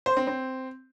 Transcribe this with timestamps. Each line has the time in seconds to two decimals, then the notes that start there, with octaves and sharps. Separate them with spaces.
0.06 C5
0.17 C4
0.27 C4